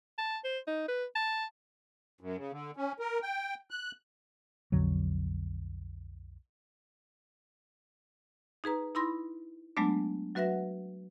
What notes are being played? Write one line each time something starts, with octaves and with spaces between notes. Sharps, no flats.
A5
C5
D#4
B4
A5
F#2
C#3
D3
C#4
A#4
G5
F#6
B1 F2 D3 F#3
D#4 G#4 B4 A#5
D#4 E4 B5 C6 A#6
F#3 G#3 A3 B3 D4
F#3 F#4 B4 E5 F#5 A#6